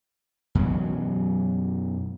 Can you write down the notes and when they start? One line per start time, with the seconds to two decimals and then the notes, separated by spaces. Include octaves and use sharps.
0.55 F#2 B2 E3 F#3